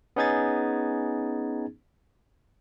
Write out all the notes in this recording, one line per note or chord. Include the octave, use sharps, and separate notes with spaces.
B3 C#4 D#4 G#4 G#6 A6